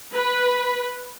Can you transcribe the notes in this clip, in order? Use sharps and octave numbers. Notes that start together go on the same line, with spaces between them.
B4